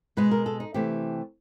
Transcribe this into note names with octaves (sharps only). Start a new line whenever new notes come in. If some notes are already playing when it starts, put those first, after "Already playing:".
B2 G#3 B4
A#4
A4
D#4
C3 E3 A3 G4